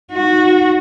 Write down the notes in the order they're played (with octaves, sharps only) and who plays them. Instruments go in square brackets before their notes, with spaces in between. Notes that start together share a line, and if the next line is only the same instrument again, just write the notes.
[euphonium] D#4 [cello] F#4